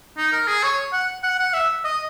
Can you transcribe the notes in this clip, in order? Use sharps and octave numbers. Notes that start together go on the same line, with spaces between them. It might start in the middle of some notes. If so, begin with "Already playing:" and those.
D#4
A#4
G#4
C#5
F#5
F#5
F#5
E5
D#5